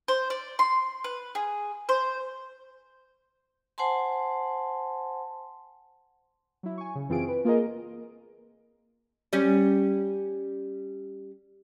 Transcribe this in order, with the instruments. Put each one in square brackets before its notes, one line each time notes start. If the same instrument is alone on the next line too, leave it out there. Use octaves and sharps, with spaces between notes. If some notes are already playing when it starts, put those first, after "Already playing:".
[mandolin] C5
D5
C6
B4
G#4
C5
[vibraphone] C5 F#5 G#5 A5 C6
[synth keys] F#3 E4
G#5 C#6
C#3
F#2 E3 C4 F4 G#4 D7
B4
A#3 F4 G#4 A#4 D#5 A#5
[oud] G3 C#4